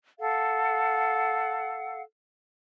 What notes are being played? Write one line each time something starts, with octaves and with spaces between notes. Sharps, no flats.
A4 F5 F#5